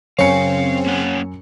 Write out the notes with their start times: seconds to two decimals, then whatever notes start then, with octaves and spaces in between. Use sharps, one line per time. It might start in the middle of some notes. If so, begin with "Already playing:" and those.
0.19 F#2 C#3 C4 C#5 F5 G#5 C#7
0.87 A#3 C#4 F#5